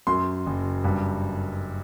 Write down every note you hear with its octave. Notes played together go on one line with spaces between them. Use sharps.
F#2 C6
F#1
G2